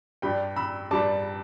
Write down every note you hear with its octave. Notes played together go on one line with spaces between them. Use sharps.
G2 G3 D4 G5 B5
B5 E6
G2 G3 D4 A5 D6